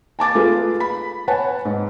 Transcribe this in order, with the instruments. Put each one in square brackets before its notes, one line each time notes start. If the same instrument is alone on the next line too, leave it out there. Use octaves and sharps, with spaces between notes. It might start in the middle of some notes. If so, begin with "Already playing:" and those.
[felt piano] G#5 A5 D6 A6
A3 F4 G#4 B4
B5
B4 C#5 F#5 G#5 A5
G#2